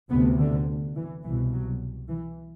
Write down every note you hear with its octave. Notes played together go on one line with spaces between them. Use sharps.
D2 C3 B3
D3
E3
C2 B2 E3
F#3
E3